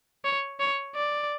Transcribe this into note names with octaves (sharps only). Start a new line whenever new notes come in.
C#5
C#5
D5